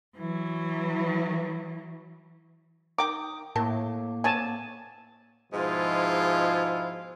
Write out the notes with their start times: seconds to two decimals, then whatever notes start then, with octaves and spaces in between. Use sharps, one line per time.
0.16 E3 F#3
2.98 D#3 G5 A#5 D6 D#6
3.56 A2 A#3 A#4 G5 A5
4.24 B3 C4 C#5 G#5 A5
5.52 G#2 B2 F3 G#3 E4 F4